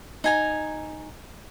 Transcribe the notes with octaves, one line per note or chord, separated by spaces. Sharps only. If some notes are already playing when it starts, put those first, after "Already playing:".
D#4 G#5 A#5